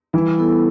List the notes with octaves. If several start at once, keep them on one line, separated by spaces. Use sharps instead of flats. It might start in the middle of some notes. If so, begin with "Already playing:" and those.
E3 G3
B3 E4 A4